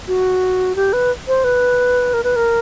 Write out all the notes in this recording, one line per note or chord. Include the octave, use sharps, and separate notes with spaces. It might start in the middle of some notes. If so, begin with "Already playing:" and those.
F#4
G4
B4
C5
B4
A#4
B4
A#4